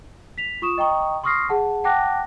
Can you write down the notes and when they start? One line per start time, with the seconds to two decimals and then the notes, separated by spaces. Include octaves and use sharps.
0.38 B6 F7
0.62 F4 C#6 D#6 E7
0.78 D#5 G5 A#5 C#6 D#6
1.24 C6 C#6 D#6 F6 A#6 C7
1.49 G#4 F#5 A5
1.84 F#5 G5 A5 D6 F#6 A#6